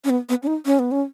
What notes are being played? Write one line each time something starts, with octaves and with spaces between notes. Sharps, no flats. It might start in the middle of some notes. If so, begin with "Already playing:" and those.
C#4
B3
B3
C#4
D#4
C#4
B3
C#4